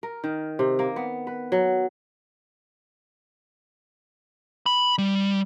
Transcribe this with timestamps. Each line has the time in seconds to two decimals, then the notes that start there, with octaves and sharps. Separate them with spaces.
0.03 A#4
0.24 D#3
0.59 C3
0.79 A#3
0.96 B3
1.27 B4
1.52 F#3
4.66 B5
4.98 G3